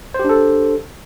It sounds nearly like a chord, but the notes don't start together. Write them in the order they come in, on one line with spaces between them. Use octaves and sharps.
C5 G4 D4 A4